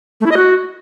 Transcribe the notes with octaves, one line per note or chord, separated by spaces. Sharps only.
A3
E4
D#5
F#4